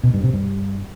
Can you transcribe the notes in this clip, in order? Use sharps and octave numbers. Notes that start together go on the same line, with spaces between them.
B2
G2
C3
G2